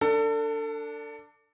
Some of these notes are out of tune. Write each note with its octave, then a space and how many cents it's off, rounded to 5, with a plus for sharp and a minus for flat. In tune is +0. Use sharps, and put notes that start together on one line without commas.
D4 -5 A4 +30